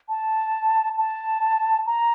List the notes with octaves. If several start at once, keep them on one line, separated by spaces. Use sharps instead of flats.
A5
A5
A#5